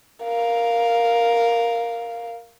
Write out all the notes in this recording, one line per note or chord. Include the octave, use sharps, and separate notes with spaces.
A#4 F5